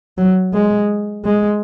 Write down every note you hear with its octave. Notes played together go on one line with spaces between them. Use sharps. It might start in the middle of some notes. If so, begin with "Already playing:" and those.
F#3
G#3
G#3